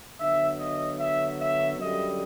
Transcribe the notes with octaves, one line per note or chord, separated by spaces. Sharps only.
D3 F#3 B3 E5
D#5
E5
E5
F#2 D3 G3 D#5